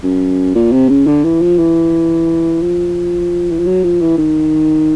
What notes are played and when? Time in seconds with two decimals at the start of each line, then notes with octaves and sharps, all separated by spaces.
0.03 F#2
0.55 A#2
0.72 C3
0.89 C#3
1.07 D3
1.24 E3
1.41 F3
1.58 E3
2.62 F3
3.51 E3
3.59 F3
3.66 F#3
3.84 F3
4.01 E3
4.18 D#3